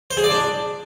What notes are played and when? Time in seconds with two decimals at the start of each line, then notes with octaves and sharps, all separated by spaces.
0.11 C5
0.17 G#4
0.24 D5
0.30 D4